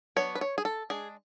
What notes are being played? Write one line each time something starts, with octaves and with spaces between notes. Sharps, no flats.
F#3 B3 D4 C#5
B4
C#5
G#4
A4
G#3 D4 G#4